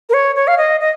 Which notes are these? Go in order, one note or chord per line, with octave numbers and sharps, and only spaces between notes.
A#4
C#5
C#5
F5
D#5
D#5